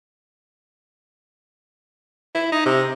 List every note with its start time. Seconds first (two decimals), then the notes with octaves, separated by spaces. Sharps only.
2.35 E4
2.52 D#4
2.66 C3